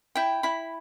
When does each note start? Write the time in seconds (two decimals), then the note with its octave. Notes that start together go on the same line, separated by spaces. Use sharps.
0.15 E4 G5
0.43 E4 B5